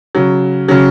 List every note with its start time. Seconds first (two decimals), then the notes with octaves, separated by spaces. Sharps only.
0.15 C#3 F#3
0.68 C#3 F#3